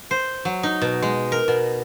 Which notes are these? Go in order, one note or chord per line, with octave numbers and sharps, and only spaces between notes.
C5
F#3
D#4
B2
G#3
A#4
B2